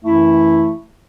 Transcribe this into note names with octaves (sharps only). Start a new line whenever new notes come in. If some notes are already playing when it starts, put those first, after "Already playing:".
F#2 E3 A3 E4